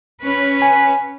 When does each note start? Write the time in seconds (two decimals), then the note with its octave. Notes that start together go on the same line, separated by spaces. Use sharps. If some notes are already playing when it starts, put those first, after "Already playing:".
0.22 C#4 B4
0.62 G#5